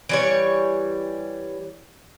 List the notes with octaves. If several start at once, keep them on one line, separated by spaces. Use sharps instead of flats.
E3 G3 C#5